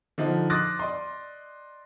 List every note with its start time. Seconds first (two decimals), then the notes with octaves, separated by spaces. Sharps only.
0.18 D3 F3 D#4
0.50 C6 D6 D#6 F#6 A6 A#6
0.79 D5 D#5 C6